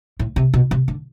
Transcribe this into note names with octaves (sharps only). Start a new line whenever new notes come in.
A2
C3
B2
C3
D3